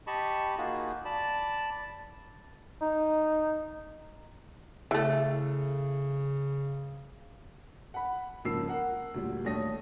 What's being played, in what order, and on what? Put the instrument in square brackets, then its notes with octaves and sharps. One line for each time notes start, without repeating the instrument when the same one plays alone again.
[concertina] G4 D#5 A5 B5 C#6
A#3 D#4 F4 F#4 G#4
D5 A5 B5
[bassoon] D#4
[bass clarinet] C#3 [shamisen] E3 A3
[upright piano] F#5 B5
G#2 C#3 F3 A#3 E6 C7
A#4 F#5
D2 A#2 G3
D#2 A3 D4 C#5 D#6 A#6